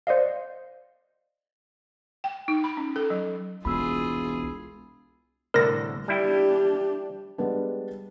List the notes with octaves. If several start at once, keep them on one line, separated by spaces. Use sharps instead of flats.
C5 D5 D#5 F5
G5
D#4
B5
C#4
A4
F#3
E1 C2 A#2 F4 G#4 B5 E6
C2 A2 D3 A#4 A#6
G3 D4 E4 G4 G5
G3 G#3 B3 D4